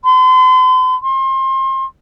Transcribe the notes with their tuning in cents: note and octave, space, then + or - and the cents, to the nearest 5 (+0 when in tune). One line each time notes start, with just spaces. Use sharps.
C6 -40
C6 +30